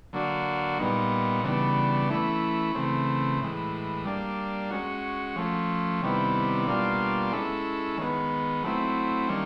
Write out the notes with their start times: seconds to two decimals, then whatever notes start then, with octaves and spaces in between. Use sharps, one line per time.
0.13 D3 F#3 A#3 D4 F#4
0.79 A#2 G3 B3 D#4
1.44 C#3 E3 G3 B3 D4
2.10 E3 A3 C#4 E4
2.75 C#3 E3 A3 C4
3.40 A2 E3 G#3
4.05 G3 A#3 D4
4.70 G#3 C#4 F#4
5.36 F3 A3 C#4
6.02 C3 D#3 G3 B3 E4
6.67 B2 G3 A#3 D4 F4
7.33 G#3 C#4 E4 A4
7.98 D#3 G#3 B3
8.63 F#3 A3 C4 E4
9.29 D#3 G3 A#3 C#4